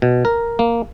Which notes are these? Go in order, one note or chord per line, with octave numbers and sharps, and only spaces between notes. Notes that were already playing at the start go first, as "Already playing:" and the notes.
B2
A#4
A#3